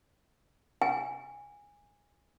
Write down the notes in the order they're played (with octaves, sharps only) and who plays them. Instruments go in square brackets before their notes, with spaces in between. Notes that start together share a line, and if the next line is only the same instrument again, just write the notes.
[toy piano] G#5